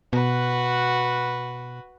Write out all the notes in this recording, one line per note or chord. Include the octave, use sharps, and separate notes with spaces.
B2 F#4 B4